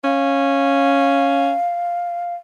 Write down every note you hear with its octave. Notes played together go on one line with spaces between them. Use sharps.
C#4 F5